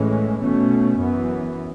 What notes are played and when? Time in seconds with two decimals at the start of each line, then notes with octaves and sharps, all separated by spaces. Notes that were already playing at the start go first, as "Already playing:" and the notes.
Already playing: A2 E3 G#3 C#4
0.41 B2 A3 C#4
0.99 F#2 E3 B3